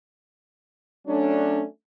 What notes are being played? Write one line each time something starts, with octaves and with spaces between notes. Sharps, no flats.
F#3 A3 C#4 D4